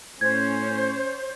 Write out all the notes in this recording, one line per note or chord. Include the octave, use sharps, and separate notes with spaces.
A2 C#4 C5 C#5 G#6